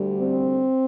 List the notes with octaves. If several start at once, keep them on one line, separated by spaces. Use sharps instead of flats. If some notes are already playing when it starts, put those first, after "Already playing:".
Already playing: D2 D3 G3
C4